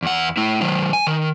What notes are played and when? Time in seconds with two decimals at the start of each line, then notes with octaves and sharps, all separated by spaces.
0.03 E2 F#5
0.37 A3 E4
0.61 D#3 F#3
0.93 G#5
1.07 D#3